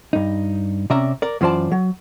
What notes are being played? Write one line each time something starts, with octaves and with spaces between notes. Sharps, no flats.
G2 D#4
C3 C#4 D5 E5 A#5
A#4 D5
F#2 E3 F4 C5 D5 A5
F#3